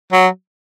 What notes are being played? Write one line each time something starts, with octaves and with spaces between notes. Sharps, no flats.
F#3